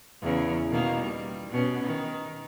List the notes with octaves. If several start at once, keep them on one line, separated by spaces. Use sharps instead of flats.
E2 C#3 E3
B2 D#3 A#3
G3
B2 B3 C#4
D#3